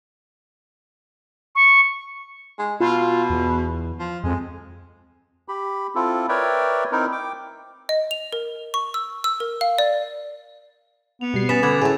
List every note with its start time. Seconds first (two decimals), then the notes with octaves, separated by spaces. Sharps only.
1.55 C#6
2.59 G#3
2.80 B2 F4
3.30 E2
3.99 F3
4.24 F2 G#3
5.48 G4 B5
5.95 C4 E4 F4 A4
6.29 A#4 B4 C#5 D5 E5 G5
6.92 C4 D#4 E4 A#4
7.12 G5 D6
7.89 D#5
8.11 F7
8.33 A#4
8.74 C#6
8.94 E6
9.24 E6
9.40 A#4
9.61 F5
9.79 D5
11.21 B3 F7
11.34 B2 G3 C7
11.49 B2 C#4 B4 A6 B6 E7
11.63 D3 B3 D6 G#6
11.81 A2 A3 G#4 A4